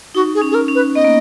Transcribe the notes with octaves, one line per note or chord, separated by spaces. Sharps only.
D#4 F#4
G#4
C#4
G#4
A#4
C#4
B4
B3 D#5
A#3